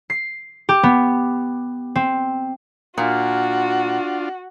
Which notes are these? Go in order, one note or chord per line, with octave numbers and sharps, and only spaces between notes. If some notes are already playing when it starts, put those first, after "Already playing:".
C7
G4
B3
C4
A#2 D4 F4 F#4